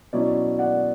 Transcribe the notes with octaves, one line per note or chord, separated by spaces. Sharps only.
B2 F#3 C#4 E4 D5
D5 F#5